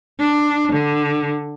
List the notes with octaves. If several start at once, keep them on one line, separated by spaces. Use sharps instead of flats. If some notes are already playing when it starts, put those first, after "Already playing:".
D4
D3